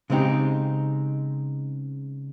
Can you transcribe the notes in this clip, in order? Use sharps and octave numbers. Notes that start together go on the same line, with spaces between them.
C#3 G#3 C4 D#4 G4